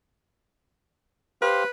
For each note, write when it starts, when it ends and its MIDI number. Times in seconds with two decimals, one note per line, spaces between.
1.42 1.64 67
1.42 1.70 71
1.42 1.64 72
1.42 1.64 77